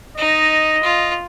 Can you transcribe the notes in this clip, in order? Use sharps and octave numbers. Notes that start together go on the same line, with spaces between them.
D#4 D#5
F4